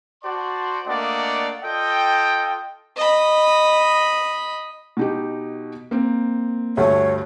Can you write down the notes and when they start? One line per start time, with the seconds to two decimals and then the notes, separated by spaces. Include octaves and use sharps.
0.24 F#4 C5 D5 A5 C6
0.87 A3 A#3 D4 D5 D#5 F#5
1.63 F4 A4 D#5 G5
2.96 D#5 B5
4.97 B2 D#4 G4
5.91 A#3 C4
6.77 D2 G2 A3 C#5